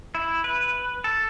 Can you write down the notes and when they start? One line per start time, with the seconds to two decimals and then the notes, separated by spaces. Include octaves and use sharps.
0.15 E4
0.44 B4
1.04 A4